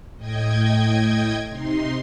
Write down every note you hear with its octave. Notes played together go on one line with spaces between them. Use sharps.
A2 D#5 G5 G#6
C3 D#4 C6